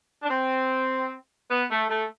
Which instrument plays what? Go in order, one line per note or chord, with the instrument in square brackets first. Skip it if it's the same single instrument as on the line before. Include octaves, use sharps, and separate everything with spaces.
[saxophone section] D4
C4
B3
A3
A3